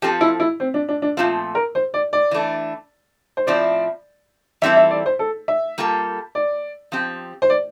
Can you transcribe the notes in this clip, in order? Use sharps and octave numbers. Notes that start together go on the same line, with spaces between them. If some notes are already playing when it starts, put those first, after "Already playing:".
F3 C4 F4 G4 A4
E4
E4
C4
D4
D4
D4
A#2 F3 A3 C4 F4
A#4
C5
D5
D5
E3 A3 D4
C5
A2 F3 C4 E4 D5
E3 G3 C4 E4 A4 E5
E5
D5
C5
A4
E5
G3 A#3 F4 A4
D5
F3 C4 G4
C5
D5